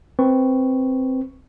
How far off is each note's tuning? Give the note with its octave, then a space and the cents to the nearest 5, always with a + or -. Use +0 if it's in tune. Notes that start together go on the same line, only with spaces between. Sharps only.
C4 +0 B4 +0 C#6 +0